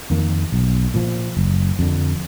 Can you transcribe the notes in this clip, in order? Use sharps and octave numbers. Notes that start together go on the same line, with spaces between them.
F2 D#3 A#3
B1
A#2 F3
F#1
F2 D3